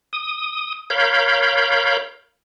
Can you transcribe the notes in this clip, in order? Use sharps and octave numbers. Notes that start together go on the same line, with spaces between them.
D#6
A#4 C#5 F5 B5 G6